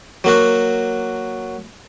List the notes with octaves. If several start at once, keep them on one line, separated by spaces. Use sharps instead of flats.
F#3 A#3 F#4